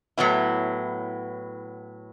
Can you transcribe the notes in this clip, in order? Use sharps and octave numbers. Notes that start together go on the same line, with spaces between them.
A2 F#3 B3 E4